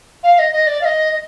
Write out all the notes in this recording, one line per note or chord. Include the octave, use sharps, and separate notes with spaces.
F5
D#5
D#5
D5
F5
D#5
D#5